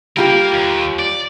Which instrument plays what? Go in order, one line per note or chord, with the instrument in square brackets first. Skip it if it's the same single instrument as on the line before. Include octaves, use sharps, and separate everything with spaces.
[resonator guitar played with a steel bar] G3 F4 G4 [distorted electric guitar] A#3 A#4
[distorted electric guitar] D#2
D5